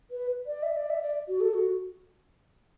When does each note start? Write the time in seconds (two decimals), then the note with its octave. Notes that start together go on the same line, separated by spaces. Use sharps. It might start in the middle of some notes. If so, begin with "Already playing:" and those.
0.11 B4
0.46 D5
0.62 E5
0.76 D5
0.89 E5
1.02 D5
1.28 F#4
1.40 A4
1.53 F#4